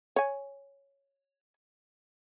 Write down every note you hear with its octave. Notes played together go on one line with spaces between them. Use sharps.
C#5 G#5